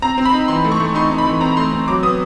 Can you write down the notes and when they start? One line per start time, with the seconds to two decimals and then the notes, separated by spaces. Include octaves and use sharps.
0.02 C4 A#5
0.18 C4
0.25 B5
0.33 D#4
0.48 E3 C6
0.65 A3
0.72 C#6
0.80 A3
0.95 D#4 C6
1.11 D#4
1.18 B5
1.26 E3
1.41 C4 A#5
1.57 A3 C6
1.72 C4
1.88 F#3 D6
2.03 B3 D#6